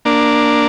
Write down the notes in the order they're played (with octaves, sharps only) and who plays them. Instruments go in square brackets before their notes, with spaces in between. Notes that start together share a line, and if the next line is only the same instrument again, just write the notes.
[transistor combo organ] A#3 D4